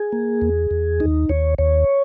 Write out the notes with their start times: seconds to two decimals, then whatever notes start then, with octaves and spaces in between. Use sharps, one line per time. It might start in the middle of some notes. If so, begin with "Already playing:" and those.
Already playing: G#4
0.12 A#3
0.42 E2
0.71 E2
1.00 D#2 D#4
1.29 D#2 C#5
1.58 D#2 C#5